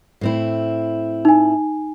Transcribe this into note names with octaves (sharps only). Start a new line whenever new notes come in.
A2 C4 E4
D#4 G#5